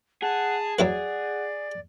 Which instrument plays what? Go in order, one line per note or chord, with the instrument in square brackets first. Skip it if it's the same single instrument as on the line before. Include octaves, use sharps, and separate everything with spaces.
[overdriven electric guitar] G#4 [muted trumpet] F#5 [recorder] A5
[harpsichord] F#3 E4 B4 [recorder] D5 [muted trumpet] F#5